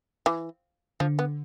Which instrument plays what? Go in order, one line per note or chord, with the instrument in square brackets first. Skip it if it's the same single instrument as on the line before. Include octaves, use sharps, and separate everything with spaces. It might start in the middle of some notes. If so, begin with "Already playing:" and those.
[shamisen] E3
[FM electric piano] D3 [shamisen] F3
[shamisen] B3